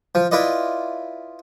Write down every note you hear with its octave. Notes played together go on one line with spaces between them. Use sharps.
F3
E4 F4 B4 D5 D#5